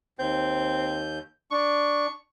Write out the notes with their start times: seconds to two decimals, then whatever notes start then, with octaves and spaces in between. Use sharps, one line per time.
0.19 D#2 C4 G6
1.51 D4 C#6